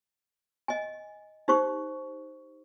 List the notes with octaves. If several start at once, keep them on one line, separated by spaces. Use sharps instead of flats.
D#5 G#5
D#4 G4 C5 C#6